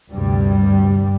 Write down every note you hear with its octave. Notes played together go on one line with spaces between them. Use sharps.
D2 G2 C3 G3